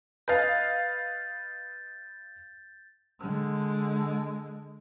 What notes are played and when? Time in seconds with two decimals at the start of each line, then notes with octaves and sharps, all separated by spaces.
0.28 B4 D#5 F5 G6 A6
3.19 D3 G#3